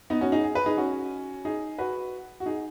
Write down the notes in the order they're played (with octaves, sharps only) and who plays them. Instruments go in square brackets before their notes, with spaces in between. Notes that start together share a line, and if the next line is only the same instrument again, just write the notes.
[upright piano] B3 D#4
C#4 F#4
D#4 G#4
G#4
B4
D#4 G#4
C#4 F#4
D#4 G#4
F#4 B4
F#4
D#4 G#4